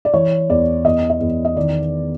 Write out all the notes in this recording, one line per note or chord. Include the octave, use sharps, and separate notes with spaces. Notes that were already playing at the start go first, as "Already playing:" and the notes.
D5
E3 C#5
E2 D5
E2 D#5
D#5
E2
D#5
D#3 D5